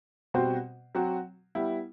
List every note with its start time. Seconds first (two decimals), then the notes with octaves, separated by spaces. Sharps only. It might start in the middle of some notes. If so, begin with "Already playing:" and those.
0.34 B2 G3 C4 F#4 C5
0.95 F#3 C4 F#4
1.55 G3 B3 E4